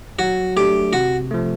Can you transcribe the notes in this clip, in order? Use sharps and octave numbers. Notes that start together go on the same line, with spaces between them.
F#3 F#4
A3 D4 G4
C3 F#4
F3 A3